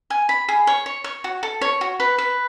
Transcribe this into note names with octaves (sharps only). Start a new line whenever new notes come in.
G#5
B5
G#4
C#5
C#5
C#5
F#4
A4
C#5
F#4
B4
B4